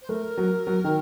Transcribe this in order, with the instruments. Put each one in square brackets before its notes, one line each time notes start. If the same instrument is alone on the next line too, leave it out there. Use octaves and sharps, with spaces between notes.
[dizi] C5
[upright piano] A3 [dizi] A#4
[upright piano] F#3
F#3
D#3